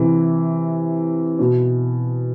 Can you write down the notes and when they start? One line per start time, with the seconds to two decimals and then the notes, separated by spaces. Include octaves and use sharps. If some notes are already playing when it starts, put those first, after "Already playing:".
Already playing: C3 E3
1.39 B2